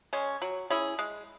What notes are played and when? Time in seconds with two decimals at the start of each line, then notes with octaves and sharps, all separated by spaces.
0.13 G#3 C#4
0.42 F#3
0.70 C#4 E4 G#4
0.99 G#3